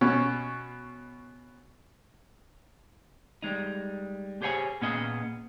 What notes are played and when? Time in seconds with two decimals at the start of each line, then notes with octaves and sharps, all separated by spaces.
0.01 B2 C#4
3.42 G3 G#3 D#4
4.42 G4 G#4 C5 C#5 G5 G#5
4.82 A#2 B3 C#4 G#4 D#5